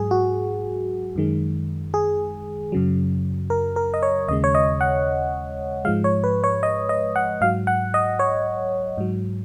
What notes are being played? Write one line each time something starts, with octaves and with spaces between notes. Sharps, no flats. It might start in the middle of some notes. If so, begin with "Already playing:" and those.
Already playing: G#2 F#3 G#4
F#4
F#2 D#3 G#3
G#4
F#2 C#3 F#3
A#4
A#4
D#5
C#5
D#2 C#3 G#3 D#5
C#5
D#5
F#5
G#2 F3 G#3 F5
C#5
B4
C#5
D#5
D#5
F#5
G#2 F#3 F5
F#5
D#5
C#5
G#2 F#3